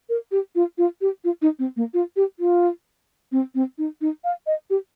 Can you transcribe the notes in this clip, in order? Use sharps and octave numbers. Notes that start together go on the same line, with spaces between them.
A#4
G4
F4
F4
G4
F4
D#4
C4
A#3
F4
G4
F4
C4
C4
D#4
D#4
F5
D#5
G4